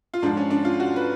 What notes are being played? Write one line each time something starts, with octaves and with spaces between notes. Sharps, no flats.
F4
G#2 F3 D4
C#4
D4
F4
F#4
B4